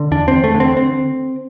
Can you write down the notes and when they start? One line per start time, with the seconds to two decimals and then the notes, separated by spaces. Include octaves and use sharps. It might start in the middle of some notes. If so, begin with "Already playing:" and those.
Already playing: D3
0.11 E2 D4
0.28 C4
0.33 E2
0.44 A3
0.55 D3
0.60 C4
0.77 C4